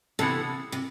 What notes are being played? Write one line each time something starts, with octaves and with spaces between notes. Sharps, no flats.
C3 E3 B3 D4 A4
C3